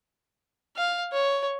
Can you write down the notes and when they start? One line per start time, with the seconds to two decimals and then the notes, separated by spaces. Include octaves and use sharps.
0.76 F5
1.12 C#5